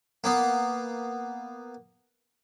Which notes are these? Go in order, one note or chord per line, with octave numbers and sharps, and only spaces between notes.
A#3 B3